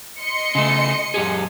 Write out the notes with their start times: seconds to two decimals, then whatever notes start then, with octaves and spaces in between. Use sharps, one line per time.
0.21 D#5 C6 C#7
0.55 C#3 A3
1.14 F#2 G4 G#4